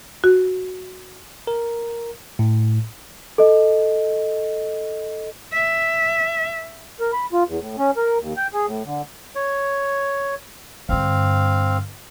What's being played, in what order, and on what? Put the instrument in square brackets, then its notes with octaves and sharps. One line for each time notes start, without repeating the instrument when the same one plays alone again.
[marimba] F#4
[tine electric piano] A#4
A2
[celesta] A4 D#5
[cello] E5
[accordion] A#4
B5
F4
E2
A2
C#4
A#4
D#2
G5
G#4
A2
D3
[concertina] C#5
[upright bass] G2 D3 [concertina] C4 F5